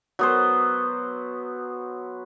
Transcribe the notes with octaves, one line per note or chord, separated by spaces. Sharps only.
F#3 B3 C5